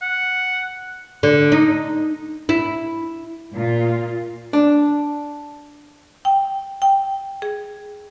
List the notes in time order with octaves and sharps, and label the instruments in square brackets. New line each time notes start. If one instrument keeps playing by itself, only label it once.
[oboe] F#5
[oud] D3
D#4
E4
[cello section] A#2 F4
[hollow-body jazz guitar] D4
[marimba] G5
G5
G#4